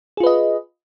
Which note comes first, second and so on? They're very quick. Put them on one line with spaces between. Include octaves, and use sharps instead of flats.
G#4 F4 B4 D#5